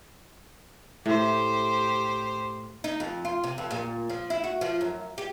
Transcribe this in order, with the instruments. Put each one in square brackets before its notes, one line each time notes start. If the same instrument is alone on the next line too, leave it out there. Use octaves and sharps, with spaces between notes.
[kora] A2 [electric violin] G4 C5
[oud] D#4
F2
F4
C3
F2
A#2
F3
E4
F#4
F3
F#2
G4